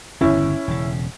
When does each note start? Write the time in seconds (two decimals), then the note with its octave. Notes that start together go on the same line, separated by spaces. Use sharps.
0.21 G1 E2 C#3 C#4 E4
0.68 E1 C#3